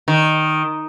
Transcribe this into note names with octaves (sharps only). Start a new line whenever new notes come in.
D#3